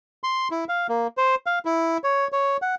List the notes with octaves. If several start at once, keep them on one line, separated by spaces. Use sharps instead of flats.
C6
E4
F5
A#3
C5
F5
E4
C#5
C#5
F#5